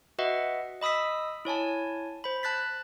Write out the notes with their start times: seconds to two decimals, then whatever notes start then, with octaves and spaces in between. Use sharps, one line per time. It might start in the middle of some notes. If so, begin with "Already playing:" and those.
0.19 F#4 B4 D#5 E5 F#5
0.81 D#5 B5 D#6 E6 B6
1.45 E4 C#5 G#5 A5
2.24 C5 B5
2.43 A5 F#6 A6 B6